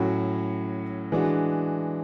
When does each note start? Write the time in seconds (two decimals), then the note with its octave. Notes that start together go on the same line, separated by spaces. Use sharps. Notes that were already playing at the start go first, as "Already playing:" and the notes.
Already playing: A2 F#3 C#4 F#4
1.12 E3 G#3 D4 F#4